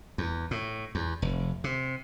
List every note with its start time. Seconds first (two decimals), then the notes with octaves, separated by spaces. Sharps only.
0.18 E2
0.51 A2
0.95 E2
1.22 F1
1.64 C3